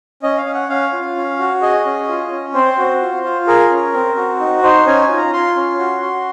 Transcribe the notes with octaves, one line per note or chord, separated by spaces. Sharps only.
C#4 D#5
F5
C#4
F#5
C#4 F5
F4
C#4
F#4
G#4 D#5
C#4
F4
C#4
C4 C5
F#4
F4
F4
G#4 A#4
C#4
C4
F#4
D#4
D#4 C5
C#4 G#5
G#5
F4
A#5
F4 C6
C#4
F#4
F#4